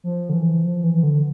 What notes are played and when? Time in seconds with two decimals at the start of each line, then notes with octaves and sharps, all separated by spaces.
0.04 F3
0.29 D3
0.34 E3
0.64 F3
0.84 E3
0.94 E3
1.03 D3